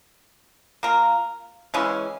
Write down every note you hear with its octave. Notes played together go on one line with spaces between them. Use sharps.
A#3 F4 A#4
C#3 E3 G#3 C#4